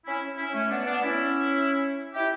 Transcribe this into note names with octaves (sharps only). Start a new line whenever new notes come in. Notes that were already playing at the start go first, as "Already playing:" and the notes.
C#4 E4
C#4 E4
A3 C#4
B3 D4
B3 D4
C#4 E4
E4 G4